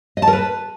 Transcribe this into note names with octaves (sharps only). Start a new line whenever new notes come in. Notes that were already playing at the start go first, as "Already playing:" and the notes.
D#5
A5
A#4
B4